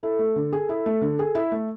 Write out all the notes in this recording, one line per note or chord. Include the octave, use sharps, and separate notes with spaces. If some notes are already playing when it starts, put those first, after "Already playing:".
E4 A4
A3
D3
G#4
E4
A3
D3
G#4
E4
A3